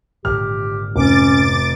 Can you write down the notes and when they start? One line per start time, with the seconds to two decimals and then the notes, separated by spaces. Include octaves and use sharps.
0.25 G#1 A#2 D3 G4 F6
0.96 F1 C#4 D6 A6